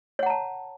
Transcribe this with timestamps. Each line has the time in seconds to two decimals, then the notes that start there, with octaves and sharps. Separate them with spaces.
0.19 C#5
0.23 F#5
0.26 A#5
0.30 A5